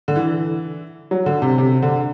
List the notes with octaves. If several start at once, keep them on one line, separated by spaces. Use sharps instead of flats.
D3
E3
F#3
D3
C3
C3
D3